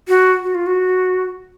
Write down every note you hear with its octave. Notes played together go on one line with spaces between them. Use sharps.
F#4
F#4
F4
F#4